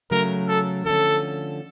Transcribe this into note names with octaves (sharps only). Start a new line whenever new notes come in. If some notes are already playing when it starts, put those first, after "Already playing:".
C#3 F#3 A3 C#4 A#4
A4
D3 F3 A3 C#4 A4